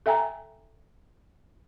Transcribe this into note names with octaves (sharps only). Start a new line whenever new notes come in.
A4 E5 G5 G#5 A#5